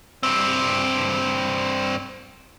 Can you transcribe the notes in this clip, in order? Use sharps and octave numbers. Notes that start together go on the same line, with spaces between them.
G2 C4